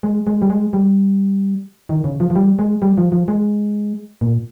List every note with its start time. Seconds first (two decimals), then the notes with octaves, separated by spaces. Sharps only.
0.03 G#3
0.27 G#3
0.42 G3
0.50 G#3
0.73 G3
1.89 D#3
2.04 C#3
2.20 F3
2.30 F3
2.35 G3
2.59 G#3
2.82 G3
2.98 F3
3.12 F3
3.28 G#3
4.21 A#2